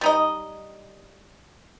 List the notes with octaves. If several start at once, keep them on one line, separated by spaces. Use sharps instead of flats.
G3 D#4 D#5